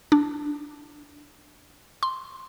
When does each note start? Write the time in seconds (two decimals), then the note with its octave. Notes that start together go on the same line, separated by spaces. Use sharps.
0.12 D4
2.03 C6